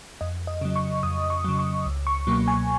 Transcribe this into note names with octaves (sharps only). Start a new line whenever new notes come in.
F2 D#5
D#5
C#3 F#3
C#6
F2 D#6
C#6
C#3 F#3
C#6
C#2
C#6
B2 F#3 A#3
G#5